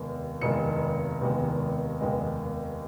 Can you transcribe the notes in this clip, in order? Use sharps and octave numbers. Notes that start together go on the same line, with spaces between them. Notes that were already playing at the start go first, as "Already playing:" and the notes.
Already playing: F1 D#2 D#3 G#3 B3
F1 D#2 D#3 G#3 B3 C#7
F1 D#2 D#3 G#3 B3
F1 D#2 D#3 G#3 B3